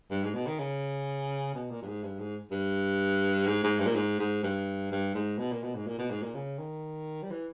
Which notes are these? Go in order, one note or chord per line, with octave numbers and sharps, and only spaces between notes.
G2
G#2
B2
D#3
C#3
B2
A#2
G2
G#2
G2
G#2
G2
G#2
G#2
G2
A#2
G#2
G#2
G2
G2
G#2
B2
A#2
B2
G#2
A#2
B2
G#2
A#2
C#3
D#3
G3
E3